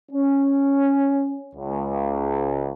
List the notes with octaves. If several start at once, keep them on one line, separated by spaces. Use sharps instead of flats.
C#4
C#2